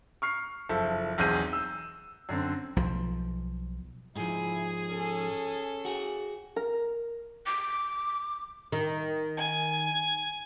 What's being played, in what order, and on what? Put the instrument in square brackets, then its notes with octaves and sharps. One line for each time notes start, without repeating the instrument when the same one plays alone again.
[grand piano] C#6 F6 C7
F#1 F3 A4 E5
B1 E2 C4 G#4 G6 D#7
E6
F#2 D3 C4
[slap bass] B1 F3
[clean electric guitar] G#2 F3 [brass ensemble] E4 [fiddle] G#4
[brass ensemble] C#4 A4
[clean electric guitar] F#4 G#4
[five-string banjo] A#4
[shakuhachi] D6
[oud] D#3
[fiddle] G#5